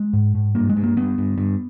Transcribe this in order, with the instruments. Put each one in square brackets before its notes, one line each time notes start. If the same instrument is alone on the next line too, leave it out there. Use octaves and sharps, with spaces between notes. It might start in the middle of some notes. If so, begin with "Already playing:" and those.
Already playing: [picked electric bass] G#3
G#2
G#2
G2 A#3
G#3
G2
A#3
G2 B3
G2
G2